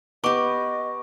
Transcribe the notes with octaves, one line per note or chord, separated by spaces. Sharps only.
B3 G4 D#5 C#6 D6